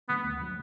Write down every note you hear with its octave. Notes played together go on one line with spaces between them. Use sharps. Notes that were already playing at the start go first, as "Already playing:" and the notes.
D3 F#3 A3 B3
D2
D3 F#3 A3